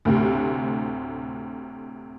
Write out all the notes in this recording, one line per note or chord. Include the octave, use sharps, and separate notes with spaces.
D2 A2 C3